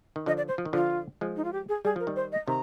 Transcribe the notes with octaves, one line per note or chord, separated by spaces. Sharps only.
D#3
D3 F3 D#5
D5
C5
F3
D#3
D3 F3 F4
F3 G#3
D#4
F4
G4
G#4
G3 G#4
F3 A#4
D#3 G3
C5
D#5
C3 D#3 A#5